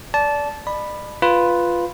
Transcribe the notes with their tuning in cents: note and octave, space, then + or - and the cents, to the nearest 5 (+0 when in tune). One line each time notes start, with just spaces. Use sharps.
D5 -20 A5 -15
D5 +45 B5 +0
F4 +0 B4 +0